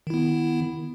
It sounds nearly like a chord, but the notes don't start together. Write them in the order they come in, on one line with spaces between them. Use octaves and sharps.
D#3 E4 B3